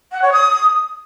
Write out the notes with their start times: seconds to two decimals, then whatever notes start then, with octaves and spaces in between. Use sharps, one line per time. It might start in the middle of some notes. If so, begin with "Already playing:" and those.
0.12 F#5
0.22 C#5
0.32 D#6